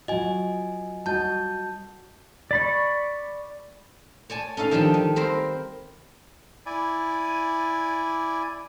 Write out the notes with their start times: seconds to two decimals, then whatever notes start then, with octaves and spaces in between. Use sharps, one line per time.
0.08 F#3 F4 F#4 D#5 G#5
1.06 G3 F#4 D#5 A5 G6
2.51 D5 B5 C#6
4.30 C#5 D5 G#5 A5
4.57 C#4 D#4 A4 F5
4.71 D#3 F3 G3 D4 G4
4.94 D#3
5.16 C4 A#4 C5 B5
6.66 E4 D5 G#5